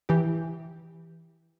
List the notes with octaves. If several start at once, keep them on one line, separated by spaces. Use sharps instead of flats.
E3 G4